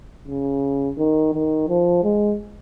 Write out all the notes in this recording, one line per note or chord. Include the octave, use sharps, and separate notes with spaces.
C#3
D#3
D#3
F3
G#3